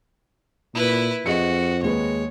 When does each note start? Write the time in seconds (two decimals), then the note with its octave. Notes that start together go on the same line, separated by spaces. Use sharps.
0.75 A#2 E4 B4
1.26 F2 F#4 G#4 D#5 C#7
1.83 D#2 G#3 B4 C#5